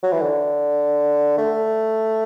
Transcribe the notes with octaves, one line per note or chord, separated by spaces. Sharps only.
F#3
E3
D3
A3